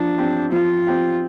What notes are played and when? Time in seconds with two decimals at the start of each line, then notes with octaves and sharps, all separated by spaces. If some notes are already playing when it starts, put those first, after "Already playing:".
Already playing: F3 D4
0.18 C4 G4
0.52 F3 F4
0.87 C4 G4